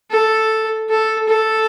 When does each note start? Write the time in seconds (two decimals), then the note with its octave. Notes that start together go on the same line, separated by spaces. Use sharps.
0.11 A4
0.89 A4
1.29 A4